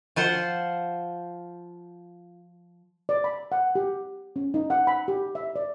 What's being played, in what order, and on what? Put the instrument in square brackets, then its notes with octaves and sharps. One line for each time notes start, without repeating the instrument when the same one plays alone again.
[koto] F3 F4 C5 F#5
[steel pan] D5
B5
F#5
G4
C#4
D#4
F#5
B5
G4
E5
D5